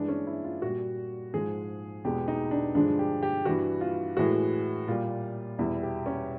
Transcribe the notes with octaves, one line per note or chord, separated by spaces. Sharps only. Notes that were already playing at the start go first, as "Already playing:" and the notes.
Already playing: G2 E3 G#3 D4
C#4
E4
F4
A#2 G3 F#4
G#2 F3 G#3 G#4
E2 B2 G#3 G4
D#4
D4
G2 D3 F3 G#3 D4
G4
G4
G2 E3 G3 F#4
F4
A2 E3 G#3 F#4
A#2 G3 F4
E2 B2 G3 E4
G4
C#4